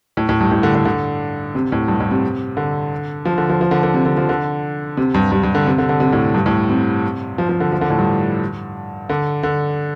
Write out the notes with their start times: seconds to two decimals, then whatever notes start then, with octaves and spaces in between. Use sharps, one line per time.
0.17 A2
0.29 A2
0.40 G2
0.51 A2
0.63 D3
0.75 D3
0.85 D3
1.55 C3
1.72 A2
1.88 G2
2.00 A2
2.11 C3
2.57 D3
3.25 F3
3.38 D3
3.49 F3
3.61 F3
3.71 D3
3.83 D3
3.94 C3
4.05 D3
4.17 F3
4.29 D3
4.97 C3
5.14 G2
5.32 G2
5.43 G2
5.55 D3
5.66 C3
5.78 D3
5.89 D3
6.00 C3
6.13 A2
6.34 G2
6.46 A2
6.70 C3
7.38 F3
7.49 F3
7.60 D3
7.72 F3
7.81 D3
7.90 A2
7.98 G2
9.09 D3
9.43 D3